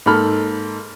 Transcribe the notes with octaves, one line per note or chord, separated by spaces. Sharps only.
G#2 A#3 A4 B5 F6